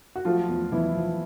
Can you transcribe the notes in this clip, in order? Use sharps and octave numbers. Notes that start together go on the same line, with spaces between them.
F#4
F3 A3 F4
E2
E2 E3 E4
F3